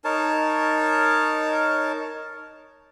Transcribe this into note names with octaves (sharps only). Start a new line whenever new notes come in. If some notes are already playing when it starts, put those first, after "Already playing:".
D#4 A#4 C#5 A5